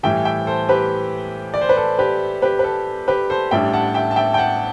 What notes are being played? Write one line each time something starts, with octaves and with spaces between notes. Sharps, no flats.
A2 E3 G3 E5 G5
E5 G5
A4 C5
G4 B4
D5
C5
B4
A4
G4 B4
G4 B4
B4
A4
G4 B4
A4 C5
A1 A2 G3 D4 E5 G5
F#5 A5
E5 G5
A5
E5 G5
G5
F#5 A5